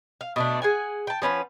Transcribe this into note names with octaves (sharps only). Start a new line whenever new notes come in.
F5
B2 A3 D4
G#4 F#5 G#5
G5 A5
F3 C#4 B4 F#5